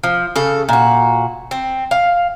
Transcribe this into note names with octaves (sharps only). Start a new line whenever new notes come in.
F3
C#3 A4
A#2 F#4
C4
F5